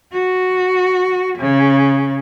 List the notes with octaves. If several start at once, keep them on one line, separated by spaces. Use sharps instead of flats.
F#4
C#3